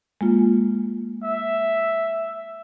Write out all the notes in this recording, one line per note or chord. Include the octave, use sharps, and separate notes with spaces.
G#3 A#3 F4
E5